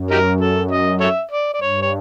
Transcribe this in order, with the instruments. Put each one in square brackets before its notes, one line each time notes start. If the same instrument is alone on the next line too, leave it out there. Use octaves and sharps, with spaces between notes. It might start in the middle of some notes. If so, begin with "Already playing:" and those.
Already playing: [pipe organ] F#2
[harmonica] D#4 G4 A#4
A4
D#5
A4 C#5 E5
D5
D5
[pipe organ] G2 [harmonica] C#5
[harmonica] C#5